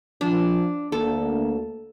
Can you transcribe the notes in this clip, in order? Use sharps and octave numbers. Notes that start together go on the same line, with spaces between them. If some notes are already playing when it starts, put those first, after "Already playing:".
F3 D4
D2 A#3 A4